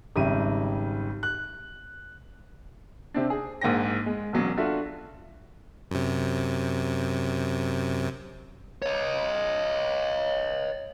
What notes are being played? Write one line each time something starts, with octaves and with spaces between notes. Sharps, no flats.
G#1 C#3 G3 E5 D#7
F#6
C3 C4 D4
G#4
A#1 G#2 A#3 G5 A#6
G#3
E1 A#1 E2 F#3 C#4
D4 F4 F#4 A4 E5
F#2 C3
C#5 D#5